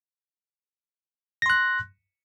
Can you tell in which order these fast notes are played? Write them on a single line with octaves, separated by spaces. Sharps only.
A#6 C6 F#6